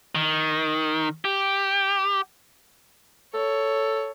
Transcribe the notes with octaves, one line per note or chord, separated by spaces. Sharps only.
D#3
G4
A4 C#5